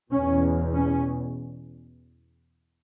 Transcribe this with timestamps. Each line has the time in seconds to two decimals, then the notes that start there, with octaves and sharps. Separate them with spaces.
0.11 E2 B2 C#4
0.73 C#4